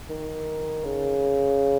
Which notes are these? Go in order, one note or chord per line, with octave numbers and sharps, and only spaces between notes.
D#3
C#3